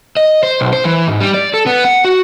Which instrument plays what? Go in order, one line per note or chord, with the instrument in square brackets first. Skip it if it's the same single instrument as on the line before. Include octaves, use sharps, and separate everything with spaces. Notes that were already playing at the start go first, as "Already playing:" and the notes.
[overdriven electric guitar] D#5
C5
B1
C5
E3
G#2
G3
D5
A4
B3
F#5
F#4